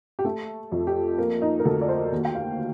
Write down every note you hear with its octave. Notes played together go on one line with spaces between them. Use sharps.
G4
A3 A4
F2
G4
A#3
D#4
A#4
D2 A4
D5
C5
D#2
G5
F5